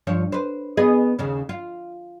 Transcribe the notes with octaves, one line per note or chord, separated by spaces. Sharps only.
G2 F3 C#5
B4 C5
B3 G#4 D#5
D#2 C#3 C#4
F4